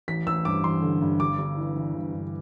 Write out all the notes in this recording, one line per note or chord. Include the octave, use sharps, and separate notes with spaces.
A1 B6
A1 E6
G2 D6
A1 C6
D3
G2
G1 D6
G1
E3
E3
G1
G1